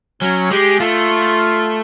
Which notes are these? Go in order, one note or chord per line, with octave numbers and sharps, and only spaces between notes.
F#3 C#4
G#3 G4
A3 F4